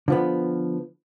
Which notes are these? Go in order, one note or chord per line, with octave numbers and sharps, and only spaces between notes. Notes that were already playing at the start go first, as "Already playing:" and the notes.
D3 F3 B3